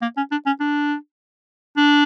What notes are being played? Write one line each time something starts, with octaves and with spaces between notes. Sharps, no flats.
A#3
C#4
D4
C#4
D4
D4